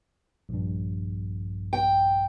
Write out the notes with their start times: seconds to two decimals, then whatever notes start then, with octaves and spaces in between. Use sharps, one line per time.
0.49 A#1 G2
1.73 G5